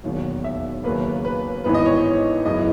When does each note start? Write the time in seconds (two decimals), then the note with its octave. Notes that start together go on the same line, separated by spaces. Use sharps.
0.04 E1 D#2 D#3 F#3
0.44 E5
0.84 D#2 C#3 F#3 A#3 B4
1.25 B4
1.64 G#1 G#2 E3 B3 D#4 B4
1.74 D#5
1.85 C#5
1.96 D#5
2.45 F#2 C#3 E3 B3 E4 D#5